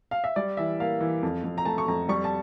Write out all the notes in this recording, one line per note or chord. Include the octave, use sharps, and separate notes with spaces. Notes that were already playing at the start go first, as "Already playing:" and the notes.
F5
E5
G3 D5
E3 E5
A#3 F5
E3
F2
F2
A#5
A3 A5
C#6
F2 A#5
G3 C#6
A5